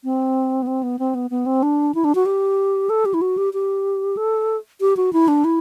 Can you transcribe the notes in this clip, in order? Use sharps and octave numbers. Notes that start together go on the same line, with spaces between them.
C4
B3
C4
B3
C4
B3
B3
C4
D4
E4
D4
F#4
G4
A4
G4
E4
F#4
G4
G4
A4
G4
F#4
E4
D4
E4